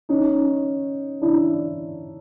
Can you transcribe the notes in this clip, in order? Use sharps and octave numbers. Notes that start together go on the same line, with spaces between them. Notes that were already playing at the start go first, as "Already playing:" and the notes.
C#4 D#4
D4 E4